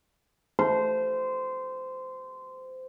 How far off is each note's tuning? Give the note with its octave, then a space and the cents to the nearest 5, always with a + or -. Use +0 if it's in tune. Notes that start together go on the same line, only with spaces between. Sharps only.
C5 -20